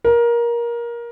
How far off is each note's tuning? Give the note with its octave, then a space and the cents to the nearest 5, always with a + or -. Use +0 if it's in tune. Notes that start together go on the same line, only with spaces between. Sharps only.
A#4 +20